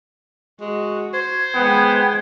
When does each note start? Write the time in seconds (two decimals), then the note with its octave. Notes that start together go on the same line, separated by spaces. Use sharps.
0.61 G#3 F#4
1.14 C5 G#6
1.55 G#3 B3 G5